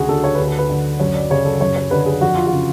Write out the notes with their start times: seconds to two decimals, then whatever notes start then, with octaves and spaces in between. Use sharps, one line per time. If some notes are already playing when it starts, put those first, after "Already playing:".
Already playing: D2 C#3 F#4 G#4
0.09 D3 A4
0.24 C#5
0.35 D2 B4
0.47 A4
0.58 B4
0.70 D3
1.00 F#2 C#5
1.15 D5
1.30 C#3 C#5
1.45 A4
1.61 F#2 C#5
1.76 C#5
1.91 D3 B4
2.06 G#4
2.21 F2 F#4
2.35 F4
2.47 F#4
2.52 C#3